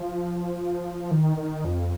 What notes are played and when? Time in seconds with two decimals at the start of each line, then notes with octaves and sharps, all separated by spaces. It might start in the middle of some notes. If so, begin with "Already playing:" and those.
Already playing: F3
1.11 D#3
1.37 D#3
1.65 F2